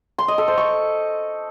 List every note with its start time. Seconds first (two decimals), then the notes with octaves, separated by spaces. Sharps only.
0.18 C6
0.28 D#5
0.38 A4
0.48 C5
0.58 C#6